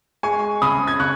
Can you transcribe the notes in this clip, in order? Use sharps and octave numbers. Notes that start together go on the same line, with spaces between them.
G#3 G#5 C#6
C#3 B5 D#6
G#6
C#3 C#6 F#6